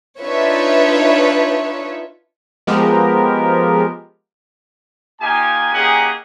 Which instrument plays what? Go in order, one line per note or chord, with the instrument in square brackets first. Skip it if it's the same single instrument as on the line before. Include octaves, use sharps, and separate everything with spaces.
[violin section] D4 D#4 F4 B4 C#5 E5
[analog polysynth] F3 G#3 B3 G4 A#4
[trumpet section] A#3 D#4 F4 G4 G#5
A#3 C#4 D#4 G4 G#4 F#5